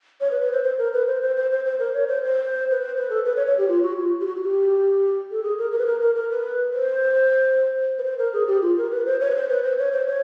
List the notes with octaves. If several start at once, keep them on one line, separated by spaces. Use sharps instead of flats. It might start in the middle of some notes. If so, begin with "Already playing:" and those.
C#5
B4
B4
C5
C5
A#4
B4
C5
C5
C5
C5
C5
A#4
C#5
C5
C5
B4
C5
B4
A4
B4
C#5
C#5
G4
F4
F#4
F4
G4
F#4
F#4
G4
A4
G#4
A#4
A#4
B4
A#4
A#4
A#4
B4
C5
B4
C5
A#4
G#4
G4
F4
A#4
B4
C5
C#5
B4
C5
B4
C5
C#5
C5
C#5